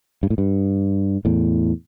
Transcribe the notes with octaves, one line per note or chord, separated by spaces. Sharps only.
G2
A2
G2
E2 A2